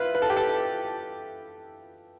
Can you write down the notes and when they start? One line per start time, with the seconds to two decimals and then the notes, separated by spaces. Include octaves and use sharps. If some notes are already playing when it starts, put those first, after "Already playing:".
Already playing: E4 F4 B4
0.15 B4
0.22 A4
0.30 G4
0.37 A4